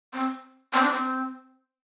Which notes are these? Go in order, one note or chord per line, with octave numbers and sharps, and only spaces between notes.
C4
C4
D4
C4